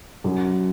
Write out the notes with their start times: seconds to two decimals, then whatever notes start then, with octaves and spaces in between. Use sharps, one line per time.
0.24 F#2